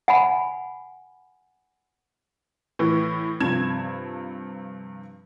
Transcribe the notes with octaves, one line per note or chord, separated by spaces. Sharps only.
F#5 G#5 B5
A2 E3
G2 C3 F3 G#6 E7